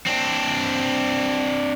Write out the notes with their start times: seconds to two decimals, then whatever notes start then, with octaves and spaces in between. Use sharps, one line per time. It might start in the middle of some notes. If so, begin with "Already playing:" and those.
0.07 C4 D4